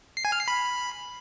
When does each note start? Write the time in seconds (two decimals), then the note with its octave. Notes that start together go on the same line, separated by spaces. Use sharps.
0.17 C7
0.25 G#5
0.32 F6
0.40 C7
0.48 B5